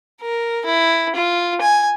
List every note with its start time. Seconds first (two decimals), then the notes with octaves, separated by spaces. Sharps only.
0.22 A#4
0.66 E4
1.15 F4
1.62 G#5